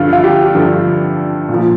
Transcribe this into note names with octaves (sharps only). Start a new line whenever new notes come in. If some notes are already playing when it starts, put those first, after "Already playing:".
Already playing: G2 D3 F3 F4
F4
G4
G2 D3 F3
A#2
F3